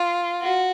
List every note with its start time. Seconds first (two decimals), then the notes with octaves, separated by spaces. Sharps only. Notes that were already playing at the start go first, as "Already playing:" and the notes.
Already playing: F4
0.41 F#4